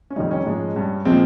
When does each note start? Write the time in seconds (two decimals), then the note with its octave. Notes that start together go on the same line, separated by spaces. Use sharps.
0.10 C#4
0.16 F2 D#3 G3 D#4
0.31 C#4
0.46 G#2 F3 G#3
0.76 G2 G3
1.05 A#2 F3 G#3 C4